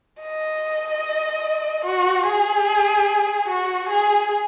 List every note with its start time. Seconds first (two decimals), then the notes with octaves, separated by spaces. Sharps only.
0.21 D#5
1.85 F#4
2.26 G#4
3.49 F#4
3.89 G#4